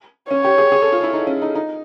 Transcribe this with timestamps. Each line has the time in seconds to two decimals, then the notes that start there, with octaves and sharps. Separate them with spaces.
0.31 C#4 C#5
0.44 G4
0.58 G#4
0.72 G#4
0.82 A4
0.92 F4
1.03 E4
1.13 D#4
1.27 C#4
1.42 D#4
1.55 D#4